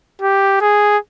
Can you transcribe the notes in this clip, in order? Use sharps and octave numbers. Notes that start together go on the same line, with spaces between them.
G4
G#4